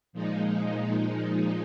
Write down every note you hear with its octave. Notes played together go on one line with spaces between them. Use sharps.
A#2 F3 G#3 D#4